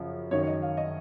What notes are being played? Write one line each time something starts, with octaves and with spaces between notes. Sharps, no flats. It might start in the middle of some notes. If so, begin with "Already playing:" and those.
Already playing: F#2 C#3 F3 F5
F#2 D#3 C#5
C#5
D#5
F5
D#5